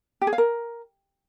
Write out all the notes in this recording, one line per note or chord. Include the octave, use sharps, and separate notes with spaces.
G4
G#4
F5
A#4